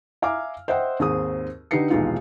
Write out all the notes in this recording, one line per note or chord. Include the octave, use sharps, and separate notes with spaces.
E5 F5 G#5 A#5 D6 F6
C5 D#5 E5 F#5 G5 C6
D#2 G#2 C4 G#4 C5 D#6
D3 D#4 G4 B4 C7 C#7
D#1 B1 E3 G#3 D#4 F4